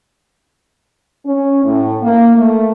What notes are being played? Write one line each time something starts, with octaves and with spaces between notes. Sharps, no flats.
C#4
A2
A#3
A3